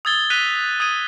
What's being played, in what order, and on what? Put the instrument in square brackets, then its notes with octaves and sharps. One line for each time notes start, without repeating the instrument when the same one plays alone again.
[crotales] D#6 E6 G#6 A6 G7
F#6 B6 D#7 F7
D#6 G#6 D#7